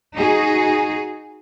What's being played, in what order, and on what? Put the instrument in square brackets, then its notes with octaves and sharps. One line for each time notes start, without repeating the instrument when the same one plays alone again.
[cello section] D#4 F#4 G#4